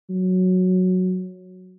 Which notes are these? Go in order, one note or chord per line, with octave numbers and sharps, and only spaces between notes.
F#3